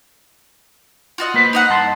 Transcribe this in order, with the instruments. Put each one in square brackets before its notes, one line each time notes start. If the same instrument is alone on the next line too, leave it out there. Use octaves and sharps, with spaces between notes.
[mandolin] F4 F#4 D#5
[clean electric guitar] A#3 B4 C5
[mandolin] D#4 D#5 F#5
[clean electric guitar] G2 A5 C6